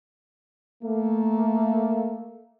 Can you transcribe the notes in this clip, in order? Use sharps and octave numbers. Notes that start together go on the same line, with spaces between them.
A3 A#3